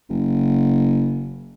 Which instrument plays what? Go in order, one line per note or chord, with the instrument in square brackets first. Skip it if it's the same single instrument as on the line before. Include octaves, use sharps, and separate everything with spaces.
[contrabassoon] F#1